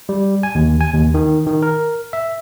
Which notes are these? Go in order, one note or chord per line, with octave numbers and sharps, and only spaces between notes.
G3
G#5
D#2
G#5
D#2
D#3
D#3
A#4
E5